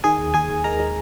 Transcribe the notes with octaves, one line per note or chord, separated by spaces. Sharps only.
D#3 G#4 G#5
D#2
D#2 G#4 G#5
D#2
G#3 A#4 A#5
G#3